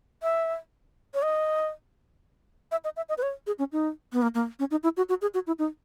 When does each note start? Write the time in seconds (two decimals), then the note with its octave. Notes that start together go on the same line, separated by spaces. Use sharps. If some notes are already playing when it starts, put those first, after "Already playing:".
0.23 E5
1.14 C#5
1.22 D#5
2.72 E5
2.84 D#5
2.97 E5
3.09 D#5
3.18 B4
3.22 C#5
3.47 G#4
3.59 C#4
3.72 D#4
4.13 B3
4.22 A#3
4.35 A#3
4.59 C#4
4.71 D#4
4.83 E4
4.97 F#4
5.09 F#4
5.22 G#4
5.34 F#4
5.47 E4
5.59 D#4